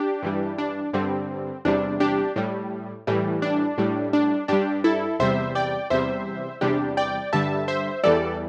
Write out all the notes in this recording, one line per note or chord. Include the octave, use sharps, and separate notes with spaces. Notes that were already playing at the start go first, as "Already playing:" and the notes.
Already playing: D4 G4
G2 E3 G3
D4
G2 D3 G3 C4
E2 C3 G3 D4
D4 G4
A2 G3
A2 E3 G3
D4
A2 G3
D4
G2 G3 D4 G4
E4 A4
E2 C3 G3 C5 E5
D5 G5
E2 C3 G3 C5 E5
E2 C3 G3 D4 G4
D5 G5
G2 D3 G3 E5 A5
C5 E5
E2 E3 G3 A4 D5